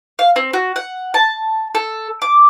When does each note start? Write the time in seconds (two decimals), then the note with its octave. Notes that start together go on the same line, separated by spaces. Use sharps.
0.19 F5
0.36 C4
0.53 F#4
0.76 F#5
1.14 A5
1.75 A4
2.22 D6